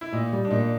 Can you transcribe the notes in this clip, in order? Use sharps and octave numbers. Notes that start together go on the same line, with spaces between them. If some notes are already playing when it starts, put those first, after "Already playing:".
E4
A#2 D#4
G3
D4
A#2 D#4